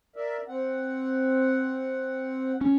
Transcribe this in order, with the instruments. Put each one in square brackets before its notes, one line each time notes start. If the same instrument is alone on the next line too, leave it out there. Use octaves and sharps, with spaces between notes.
[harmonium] A#4 D5 E5
C4 F#5
[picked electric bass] C#4